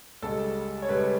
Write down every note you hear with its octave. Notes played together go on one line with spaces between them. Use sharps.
C#2 C#3 G3 A4
C#5
C#2 C#3 G3 B4